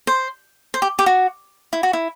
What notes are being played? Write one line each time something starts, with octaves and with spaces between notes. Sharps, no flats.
C5
C5
G4
G4
F#4
E4
F#4
E4